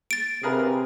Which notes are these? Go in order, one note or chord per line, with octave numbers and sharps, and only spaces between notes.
A6 D7
C3 G#4 A#4 B4